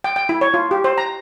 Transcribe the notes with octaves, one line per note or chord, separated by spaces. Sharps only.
G5
G5
E4
C#5
F4
G4
C5
A#5